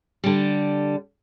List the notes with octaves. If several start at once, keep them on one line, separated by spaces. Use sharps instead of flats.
D3 G3